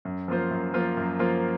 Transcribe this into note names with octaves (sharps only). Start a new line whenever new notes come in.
F#2
F3 A#3 F4 C5
F#2
F3 A#3 F4 C5
F#2
F3 A#3 F4 C5